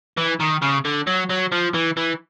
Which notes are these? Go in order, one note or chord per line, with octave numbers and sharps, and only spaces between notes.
E3
D#3
C#3
D3
F#3
F#3
F3
E3
E3